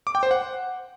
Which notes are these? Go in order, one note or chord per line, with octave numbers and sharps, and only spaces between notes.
D6
G5
C5
F#5